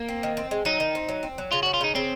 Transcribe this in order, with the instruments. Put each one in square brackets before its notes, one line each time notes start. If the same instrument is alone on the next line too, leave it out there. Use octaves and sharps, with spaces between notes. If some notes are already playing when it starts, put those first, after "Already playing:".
Already playing: [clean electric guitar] A#3
[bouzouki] C4
D#3
C4
G#3
[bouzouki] F#3 [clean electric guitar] D#4
[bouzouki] D#3
C4
F#3
C4
F#3
[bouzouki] C#3 [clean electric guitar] F4
[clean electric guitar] F#4
[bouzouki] C#4
[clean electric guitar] F4
[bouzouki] C#3 [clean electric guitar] D#4
[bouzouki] C#3 [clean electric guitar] C4